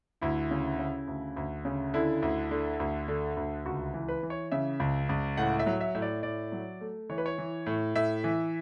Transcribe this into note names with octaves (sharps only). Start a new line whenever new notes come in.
D2 E4
C#3
C#3
D2
D2
C#3
D3 E4
D2
D3
D2
D3
D2
C#2 F#4
E3
B4
E3
C#5
C#3 E5
C#2
C#2
A2 F#5
E5
F#3
E5
A2 E5
D5
A2 D5
F#3
A3
E3 C#5
B4
C#5
E3
A2
A2 E5
E3